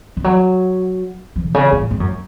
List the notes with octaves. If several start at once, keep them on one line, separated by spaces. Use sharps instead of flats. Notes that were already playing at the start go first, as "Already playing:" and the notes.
F3
F#3
F3
B2
C#3
A2
G#2
F#2